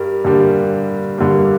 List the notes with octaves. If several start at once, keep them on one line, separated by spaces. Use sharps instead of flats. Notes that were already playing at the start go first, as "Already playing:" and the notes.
Already playing: G2 G3 A#4
G2 D3 G3 A#3
G2 D3 G3 A#3